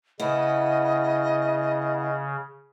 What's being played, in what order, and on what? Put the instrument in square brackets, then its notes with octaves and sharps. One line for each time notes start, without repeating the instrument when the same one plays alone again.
[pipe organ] C#3 [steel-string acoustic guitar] B3 E4 [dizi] D#5